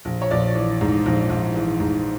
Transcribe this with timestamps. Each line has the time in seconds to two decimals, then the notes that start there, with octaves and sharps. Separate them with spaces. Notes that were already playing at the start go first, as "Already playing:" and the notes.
0.05 A#1
0.22 C#5
0.31 A#1 D5
0.55 E3
0.81 G#2
1.06 A#1
1.30 A#1
1.55 E3
1.80 G#2